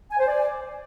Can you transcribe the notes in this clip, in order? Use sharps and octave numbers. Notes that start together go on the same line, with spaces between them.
G#5
C5
D5